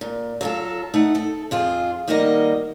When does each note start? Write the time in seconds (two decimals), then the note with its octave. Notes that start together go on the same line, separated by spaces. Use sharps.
0.01 A#2
0.41 F#3 F4 A4
0.94 A3 D#4 F#5
1.15 A4
1.51 F2 F4 G#4
2.08 D#3 G3 A#3 F#4 A#4 D#5